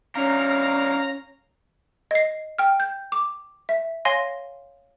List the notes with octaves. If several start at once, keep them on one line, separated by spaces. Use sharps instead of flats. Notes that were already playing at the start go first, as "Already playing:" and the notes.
D3 F#3 C#4 F5 A#5
D#5 C7
G5 F6
G6
D6
E5
C#5 F5 G#5 C6 A#6